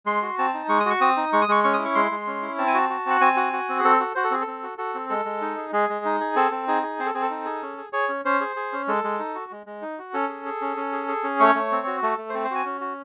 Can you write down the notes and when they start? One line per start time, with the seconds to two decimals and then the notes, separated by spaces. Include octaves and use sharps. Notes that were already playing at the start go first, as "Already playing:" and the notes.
0.06 G#3 C6
0.23 F#4
0.38 C4 A5
0.54 D#4
0.69 G#3 C#6
0.80 D#6
0.86 F#4 C#6
1.01 C4 D#6
1.17 D#4
1.33 G#3 C#6
1.42 D#6
1.48 G#3 C#6
1.64 C#4 C#6
1.74 D#6
1.79 E4
1.85 C#6
1.95 G#3 C6
2.11 G#3
2.27 C#4
2.42 E4
2.58 C4 A5
2.68 G#5
2.74 F#4 A5
2.90 F#4
3.06 C4 F#5
3.21 C4 G#5
3.37 F#4
3.53 F#4
3.69 C4
3.79 G#4
3.84 C4 A4
4.00 F#4
4.15 F#4 C5
4.24 A4
4.31 C4 G#4
4.42 A4
4.47 C4
4.63 F#4
4.78 F#4 A4
4.95 C4
5.10 G#3 A4
5.25 G#3
5.41 D#4
5.58 G#4
5.73 G#3 G#4
5.89 G#3
6.05 D#4
6.20 G#4
6.36 C4 A4
6.52 C4
6.68 D#4 G#4
6.83 G#4
6.99 C4 C5
7.06 A4
7.14 C4 G#4
7.22 A4
7.30 D#4
7.46 G#4
7.63 C#4
7.78 G#4
7.93 G#4 C#5
8.09 C#4
8.25 C#4 C5
8.41 G#4
8.56 G#4
8.73 C#4
8.88 G#3 A4
9.04 G#3
9.19 D#4
9.35 F#4
9.51 G#3
9.66 G#3
9.82 D#4
9.99 F#4
10.14 C#4 A4
10.29 G#4
10.45 G#4
10.61 C#4
10.77 C#4
10.93 G#4
11.08 G#4
11.24 C#4
11.40 A3 C#5
11.55 A3
11.71 C4
11.87 F#4
12.02 A3 A4
12.18 A3
12.30 C5
12.34 C4 A4
12.44 C5
12.51 F#4 G#5
12.66 C#4
12.81 F#4